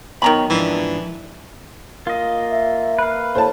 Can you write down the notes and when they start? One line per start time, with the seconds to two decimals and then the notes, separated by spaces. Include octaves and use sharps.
0.22 B1 B2 D#3 C#5 A#5 B5
0.50 G#2 E3 F3 D4
2.07 A#3 F4 D#5
2.50 E5
2.98 B4 F5
3.35 A4 C5 C#5 A5